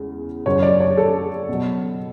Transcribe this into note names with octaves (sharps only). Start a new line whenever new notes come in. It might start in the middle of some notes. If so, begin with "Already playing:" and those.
Already playing: E2 C#3 G#3
F#2 C#3 F#3 C#5
D5
C#5
A4
B2 F#3